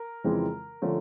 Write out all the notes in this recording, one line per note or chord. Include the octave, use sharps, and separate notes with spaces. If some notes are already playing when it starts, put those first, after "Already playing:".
Already playing: A#4
F2 C#3 E3 G#3 C4
D3 F3 A3 C#4